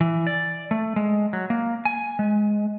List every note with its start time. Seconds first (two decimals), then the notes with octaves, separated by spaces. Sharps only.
0.01 E3
0.27 D5
0.71 A3
0.96 G#3
1.33 F#3
1.50 A#3
1.85 G#5
2.19 G#3